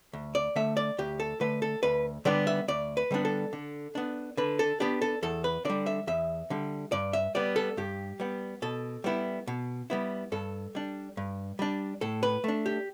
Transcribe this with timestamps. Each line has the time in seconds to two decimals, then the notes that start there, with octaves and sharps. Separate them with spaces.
0.13 D2
0.35 D5
0.56 D3 A3 E5
0.77 D5
0.98 D2 G4
1.20 A4
1.41 D3 A3 B4
1.62 A4
1.83 D2 B4
2.25 D3 G3 B3 D4 D5
2.47 E5
2.68 D2 D5
2.97 B4
3.11 D3 G3 B3 D4
3.25 A4
3.53 D3
3.95 B3 D4
4.37 D3 B4
4.59 A4
4.80 B3 D4 G4
5.02 A4
5.23 E2 A4
5.44 B4
5.65 D3 G3 D5
5.86 E5
6.07 E2 E5
6.50 D3 G3
6.92 G2 D5
7.13 E5
7.35 G3 B3 D5
7.56 A4
7.77 G2 G4
8.20 G3 B3
8.62 B2 A4
9.04 G3 B3 E4
9.47 B2
9.90 G3 B3 E4
10.32 G2 A4
10.75 G3 D4
11.17 G2
11.59 G3 D4
12.01 A2 A4
12.23 B4
12.44 A3 D4
12.66 G4